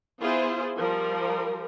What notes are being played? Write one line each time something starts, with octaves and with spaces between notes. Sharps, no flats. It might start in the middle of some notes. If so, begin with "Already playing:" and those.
B3 E4 F4 G#4 C5
F3 G3 A#4